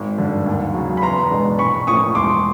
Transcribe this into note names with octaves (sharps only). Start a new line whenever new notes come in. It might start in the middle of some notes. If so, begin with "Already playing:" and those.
Already playing: G#1
G2 D3
D#2
C#3 F#3
B5
E2 A#5 C6
B2 G#3 B3 D4
A#1 B5 C#6
A2 F3 A#3 C#4 C#6 D#6
E1 C6 D6